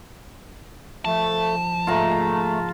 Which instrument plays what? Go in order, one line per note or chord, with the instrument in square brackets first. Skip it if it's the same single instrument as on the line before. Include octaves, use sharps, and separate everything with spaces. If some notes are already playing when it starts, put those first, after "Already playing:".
[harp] F3 [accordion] A3 [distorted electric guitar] A5
[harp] C#2 G#2 A#3 [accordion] A3 [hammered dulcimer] F4 A#5